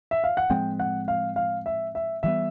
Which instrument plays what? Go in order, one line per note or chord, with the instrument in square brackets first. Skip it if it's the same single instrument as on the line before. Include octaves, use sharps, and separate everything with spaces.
[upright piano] E5
F5
F#5
[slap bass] A2 F3 G#3 C4 [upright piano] G5
[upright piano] F#5
F5
F5
E5
E5
[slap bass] E3 G3 B3 [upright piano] E5